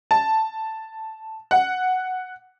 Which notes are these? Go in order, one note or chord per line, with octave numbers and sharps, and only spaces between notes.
A5
F#5